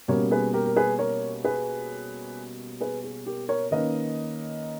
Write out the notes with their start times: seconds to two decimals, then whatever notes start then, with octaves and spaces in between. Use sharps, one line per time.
0.08 B2 G3 A#3 C#4 A#4 C#5
0.31 G#4 B4
0.53 G4 A#4
0.65 A#4
0.76 G#4 B4
0.99 A#4 C#5
1.45 G#4 B4
2.80 G#4 B4
3.04 G#4
3.26 G4 A#4
3.48 A#4 C#5
3.71 D#3 A#3 C#4 B4 D#5